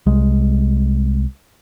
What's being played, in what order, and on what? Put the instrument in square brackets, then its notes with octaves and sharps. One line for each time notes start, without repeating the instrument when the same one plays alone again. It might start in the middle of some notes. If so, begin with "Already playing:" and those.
[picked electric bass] C2 G#3